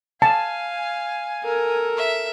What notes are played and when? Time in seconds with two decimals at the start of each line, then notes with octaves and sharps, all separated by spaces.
0.22 F5 G#5 A5
1.44 A4 A#4
1.97 E5